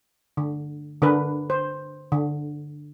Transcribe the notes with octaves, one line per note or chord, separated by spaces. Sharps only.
D3
D3 D4 A#4 B4
C5
D3